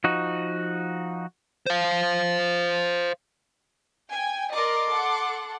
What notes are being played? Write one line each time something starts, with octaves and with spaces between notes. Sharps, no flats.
F3 D#4 F#4
C5 F5
G5 G#5 G#6
A#4 D5 D#5 C6 D6
A4 F#5